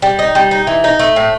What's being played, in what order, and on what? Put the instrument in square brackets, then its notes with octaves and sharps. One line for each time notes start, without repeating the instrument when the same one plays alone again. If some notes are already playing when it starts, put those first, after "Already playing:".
[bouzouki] G3
D#4
G3
D#4
E3
D#4
A3
A2